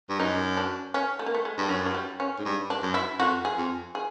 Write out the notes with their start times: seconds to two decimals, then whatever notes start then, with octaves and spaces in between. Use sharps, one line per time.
0.09 G2
0.20 F#2 D#4
0.57 D4
0.94 C#4
1.19 A3
1.26 A#3
1.35 A3
1.45 G#3
1.58 G2
1.63 G3
1.69 F#2 F#3
1.86 F#3
1.95 G3
2.20 C#4
2.39 G#2
2.45 G2
2.70 D4
2.82 F#2
2.94 E4
3.20 F2 F#4
3.45 G#4
3.57 F2
3.95 G#4